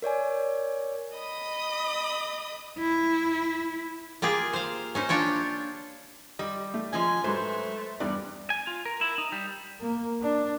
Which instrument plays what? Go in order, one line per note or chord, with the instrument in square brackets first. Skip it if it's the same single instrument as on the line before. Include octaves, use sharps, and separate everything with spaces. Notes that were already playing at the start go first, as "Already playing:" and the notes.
[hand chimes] A#4 C#5 D5 G#5
[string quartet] D#5 B5 D#6
[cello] E4
[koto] A#3 F4 G4 G#4
C5 F5
C#4 D#4 C5
D4 F4 C#5 G5
[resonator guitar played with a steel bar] G3 [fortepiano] D#5
[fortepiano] A3
[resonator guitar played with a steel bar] F3 G#3 C#4 [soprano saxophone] G#5
[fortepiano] G#2 F#3 B4 [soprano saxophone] A3 [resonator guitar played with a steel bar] C5
[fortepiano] E2 G2 [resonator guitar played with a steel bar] D5
[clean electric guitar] G#5
F4
A#4
E4
D#4
G3
[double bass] A#3
D4